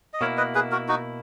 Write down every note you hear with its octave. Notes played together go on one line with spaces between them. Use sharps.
D#5
B2 A#3 E4 A#4 C#5
B4 D#5
G#4 B4
F#4 A#4
D#4 F#4